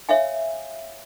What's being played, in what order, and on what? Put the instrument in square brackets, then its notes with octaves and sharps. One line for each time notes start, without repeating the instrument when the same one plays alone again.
[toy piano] C#5 E5 F5 G#5